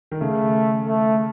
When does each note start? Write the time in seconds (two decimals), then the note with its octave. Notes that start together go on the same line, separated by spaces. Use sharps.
0.11 D#3
0.21 C#3 A3
0.87 A3